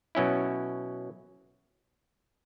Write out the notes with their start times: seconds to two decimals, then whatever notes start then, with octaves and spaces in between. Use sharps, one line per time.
0.15 B2 F#3 C#4 E4